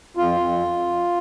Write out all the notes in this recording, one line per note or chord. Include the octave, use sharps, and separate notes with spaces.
F2 F4
F2